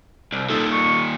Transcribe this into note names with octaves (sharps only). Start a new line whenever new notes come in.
C2
A#2 D#3 A4
C#6